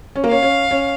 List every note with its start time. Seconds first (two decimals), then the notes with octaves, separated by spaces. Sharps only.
0.16 C#4
0.24 A#3
0.29 C#4 F5
0.43 C#4
0.71 C#4